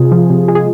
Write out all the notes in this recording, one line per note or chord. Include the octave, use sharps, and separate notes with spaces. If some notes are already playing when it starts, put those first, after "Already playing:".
Already playing: C3 F4 G#4
F3
C3
G#3
G#4